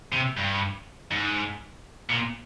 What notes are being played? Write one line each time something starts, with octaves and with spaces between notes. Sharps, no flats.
C3
G2
G#2
A#2